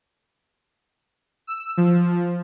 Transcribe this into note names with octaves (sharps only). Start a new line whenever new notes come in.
E6
F3